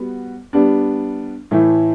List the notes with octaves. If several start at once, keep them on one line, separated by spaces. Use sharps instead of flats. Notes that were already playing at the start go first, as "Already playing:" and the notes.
Already playing: G3 B3 F#4
G3 B3 D4
A2 E3 A3 E4